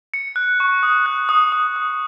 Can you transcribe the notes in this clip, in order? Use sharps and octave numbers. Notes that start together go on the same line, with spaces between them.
C#7
F#6
C#6
D#6
F#6
D#6
D#6
D#6